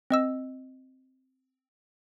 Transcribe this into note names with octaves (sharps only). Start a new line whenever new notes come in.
C4 D#5 E6